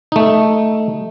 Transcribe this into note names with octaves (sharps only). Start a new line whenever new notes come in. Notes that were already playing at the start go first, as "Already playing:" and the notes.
A3 D#4